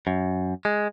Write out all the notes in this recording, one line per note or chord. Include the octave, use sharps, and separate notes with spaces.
F#2
G#3